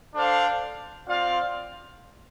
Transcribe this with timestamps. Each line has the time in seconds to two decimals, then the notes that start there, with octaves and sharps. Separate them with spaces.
0.14 D4 A4 C5 F5
1.07 C4 F4 D5 F5